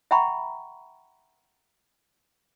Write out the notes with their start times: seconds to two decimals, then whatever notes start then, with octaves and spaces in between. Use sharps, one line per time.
0.11 E5 F#5 G5 A#5 B5 C#6